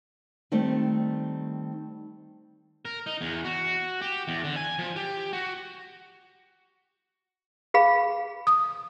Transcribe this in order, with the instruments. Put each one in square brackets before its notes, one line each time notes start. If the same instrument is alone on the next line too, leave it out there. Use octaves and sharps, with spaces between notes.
[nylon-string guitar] D#3 G3 A3 C4
[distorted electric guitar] A#4
D#4
E2
F#4
G4
E2
D3
G#5
F3
G4
F#4
[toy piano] G#4 F5 B5
[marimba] D#6